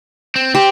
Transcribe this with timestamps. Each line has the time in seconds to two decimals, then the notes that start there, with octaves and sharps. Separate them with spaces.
0.36 C4
0.55 C4 G4